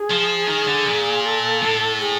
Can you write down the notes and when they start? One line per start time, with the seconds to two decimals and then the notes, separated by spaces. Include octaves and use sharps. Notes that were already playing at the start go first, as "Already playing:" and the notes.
Already playing: G#4
0.10 F3
0.48 D#3
0.67 D3
0.86 A#2
1.25 A4
1.63 A2
2.00 G#4